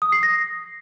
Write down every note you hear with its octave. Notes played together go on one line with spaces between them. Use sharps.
D#6
C7
A#6